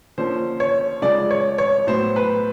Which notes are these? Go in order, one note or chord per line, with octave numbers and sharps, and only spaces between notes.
D3 F3 A#3 C#4 C5
C#5
C#3 F3 G#3 D5
C#5
C#5
A2 F#3 B3 C5
B4